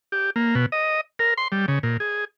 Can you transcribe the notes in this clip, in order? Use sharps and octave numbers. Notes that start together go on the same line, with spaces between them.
G4
A#3
B2
D#5
A#4
C6
G3
C#3
A#2
G#4